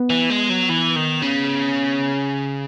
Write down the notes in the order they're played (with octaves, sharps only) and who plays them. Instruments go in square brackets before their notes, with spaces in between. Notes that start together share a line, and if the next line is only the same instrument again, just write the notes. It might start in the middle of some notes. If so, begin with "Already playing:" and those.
Already playing: [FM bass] B3
[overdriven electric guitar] E3
G#3
F#3
E3
D#3
C#3